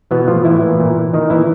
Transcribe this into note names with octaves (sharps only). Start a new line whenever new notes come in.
B2 E3 B3
A2 F3 F4
A2 E3 E4
A#2
A#2
A#2
A#2 D#3 D#4
A#2 E3 E4